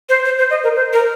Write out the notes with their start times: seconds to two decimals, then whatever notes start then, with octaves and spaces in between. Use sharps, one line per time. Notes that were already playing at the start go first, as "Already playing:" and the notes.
0.09 C5
0.25 C5
0.39 C5
0.50 D#5
0.64 A#4
0.76 C5
0.93 A#4